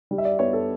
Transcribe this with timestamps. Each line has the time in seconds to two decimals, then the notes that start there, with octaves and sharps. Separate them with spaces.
0.11 G3
0.18 E5
0.25 D5
0.39 B3 C#5
0.53 A4